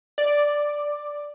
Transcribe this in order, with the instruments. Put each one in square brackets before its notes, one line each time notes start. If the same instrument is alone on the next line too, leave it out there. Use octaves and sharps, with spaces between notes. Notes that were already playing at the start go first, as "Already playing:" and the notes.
[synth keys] D5